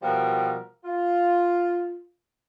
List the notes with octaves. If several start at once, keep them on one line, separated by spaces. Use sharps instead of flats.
B2 F3 G3 A#4
F4